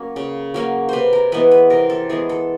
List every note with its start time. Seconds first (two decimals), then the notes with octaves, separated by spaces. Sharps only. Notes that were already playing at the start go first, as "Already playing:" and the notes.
Already playing: F#3 A#3 C#4
0.16 C#3
0.54 F#3 A#3 C#4
0.89 C3 B4 C5
1.13 A#4
1.32 E3 G#3 B3 B4
1.51 B4
1.70 C3 A#4
1.90 A4
2.09 E3 G#3 B3 G#4
2.29 A4